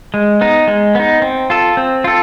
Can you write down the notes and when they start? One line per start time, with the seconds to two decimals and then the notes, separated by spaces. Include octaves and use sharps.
0.14 G#3
0.41 B3 D#4
0.68 G#3
0.95 B3 D#4
1.22 C4
1.50 F4 A4
1.77 C4
2.04 F4 A4